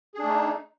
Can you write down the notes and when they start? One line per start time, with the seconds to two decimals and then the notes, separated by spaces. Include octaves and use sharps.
0.15 G#4
0.19 D4
0.23 A3
0.28 D#4